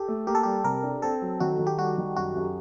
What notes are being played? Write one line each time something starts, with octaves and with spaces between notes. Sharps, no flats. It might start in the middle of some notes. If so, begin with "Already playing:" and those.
Already playing: G4 A4
A3
A#3 G4
A4
G3 G4
C3 A#4
D4
C4 A4
F#3
D#3 F#4
D#3
G4
G3 F#4
D#3
F#2 F#4
F#2